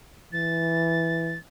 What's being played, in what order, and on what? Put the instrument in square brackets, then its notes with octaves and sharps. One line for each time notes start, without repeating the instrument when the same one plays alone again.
[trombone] E3 [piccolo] A6